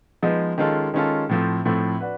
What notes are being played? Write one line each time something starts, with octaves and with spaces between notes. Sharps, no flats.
F3 G#3 B3 D#4 G#4
D#3 G#3 C#4 F4 A4
D#3 G#3 C#4 F4 A4
A2 F3 A3 C4
A2 F3 A3 C4
D4 F#4 B4